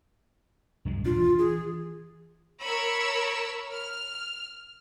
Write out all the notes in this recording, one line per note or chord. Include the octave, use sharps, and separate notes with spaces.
C2 F#2 G#3
D#1 D4 F4
E3
G#4
A#4 C#5 B5 E6
F6